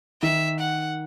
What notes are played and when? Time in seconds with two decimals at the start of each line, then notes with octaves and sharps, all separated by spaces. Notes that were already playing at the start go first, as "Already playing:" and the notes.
0.22 D#3 E5
0.60 F#5